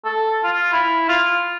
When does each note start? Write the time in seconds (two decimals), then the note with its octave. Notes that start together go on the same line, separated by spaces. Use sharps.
0.05 A4
0.44 F4
0.73 E4
1.09 F4